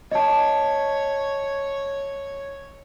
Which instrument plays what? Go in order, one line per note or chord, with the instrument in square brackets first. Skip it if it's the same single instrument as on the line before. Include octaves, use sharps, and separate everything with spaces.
[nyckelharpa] C#5 [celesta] D#5 A5